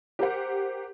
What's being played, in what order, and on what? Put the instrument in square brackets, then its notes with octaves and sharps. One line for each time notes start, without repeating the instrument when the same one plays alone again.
[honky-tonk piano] G4 A#4 C5 F#5